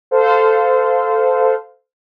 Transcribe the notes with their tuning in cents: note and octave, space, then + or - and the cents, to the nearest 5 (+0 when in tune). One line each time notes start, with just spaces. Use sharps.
A4 +0 C5 -20 F5 +5